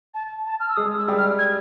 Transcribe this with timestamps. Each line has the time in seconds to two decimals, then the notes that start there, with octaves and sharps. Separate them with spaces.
0.14 A5
0.46 A5
0.60 F6
0.69 E6
0.76 G#3 G#4 D#6
0.98 E6
1.08 G3 G4
1.18 F6
1.39 G#6